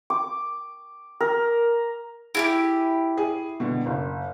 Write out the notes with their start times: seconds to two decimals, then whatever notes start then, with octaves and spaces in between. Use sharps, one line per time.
0.10 D6
1.20 A#4
2.35 E4 F4 G4 G#4
3.17 G#4
3.60 B2 D3
3.86 F#1